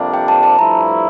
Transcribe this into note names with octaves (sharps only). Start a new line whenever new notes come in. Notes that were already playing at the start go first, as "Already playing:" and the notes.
Already playing: F2 C3 G3 A#3 D4
G5
A5
A5
G2 F3 A3 E4 A#5